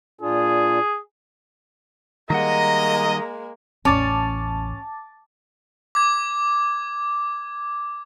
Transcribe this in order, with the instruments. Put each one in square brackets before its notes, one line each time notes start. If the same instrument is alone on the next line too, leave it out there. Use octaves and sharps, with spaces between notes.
[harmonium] A#2 D4 F4 [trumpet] G#4
[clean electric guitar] D#3 G3 F#5 [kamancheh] G#3 A#3 [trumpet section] D#5 [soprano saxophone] A#5
[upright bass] A1 E2 [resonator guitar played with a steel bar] C#4 [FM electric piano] A5 D6 A6
[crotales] D6 G#6